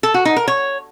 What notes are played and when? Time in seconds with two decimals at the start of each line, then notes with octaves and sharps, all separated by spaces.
0.03 A4
0.14 F#4
0.25 D#4
0.36 A#4
0.48 C#5